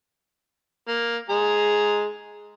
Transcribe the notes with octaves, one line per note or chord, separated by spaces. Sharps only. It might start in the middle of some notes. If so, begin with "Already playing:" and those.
A#3
G#3 G#4 A#5